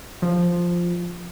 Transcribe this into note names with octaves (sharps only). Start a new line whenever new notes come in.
F3